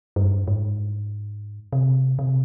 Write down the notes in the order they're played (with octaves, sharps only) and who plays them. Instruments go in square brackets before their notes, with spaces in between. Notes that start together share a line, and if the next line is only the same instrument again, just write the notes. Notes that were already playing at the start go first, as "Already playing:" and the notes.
[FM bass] G2
G#2
C3
C3